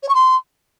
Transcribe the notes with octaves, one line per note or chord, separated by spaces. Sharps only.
C#5
C#6
C6